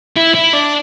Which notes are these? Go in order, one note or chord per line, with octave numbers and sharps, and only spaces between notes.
E4
E4
D4